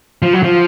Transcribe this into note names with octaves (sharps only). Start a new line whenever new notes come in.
F3
F#3
F3